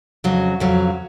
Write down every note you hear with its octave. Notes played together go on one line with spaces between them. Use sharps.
F2 C#3 F#3
F2 C#3 F#3